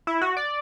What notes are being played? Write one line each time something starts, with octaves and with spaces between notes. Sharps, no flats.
E4
F#4
D5